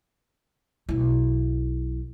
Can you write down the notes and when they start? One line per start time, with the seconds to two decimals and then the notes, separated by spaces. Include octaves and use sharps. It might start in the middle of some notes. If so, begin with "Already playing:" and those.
0.89 B1 E4